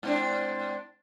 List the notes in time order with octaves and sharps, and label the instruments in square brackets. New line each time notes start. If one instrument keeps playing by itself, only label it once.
[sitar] G#2 C4 D4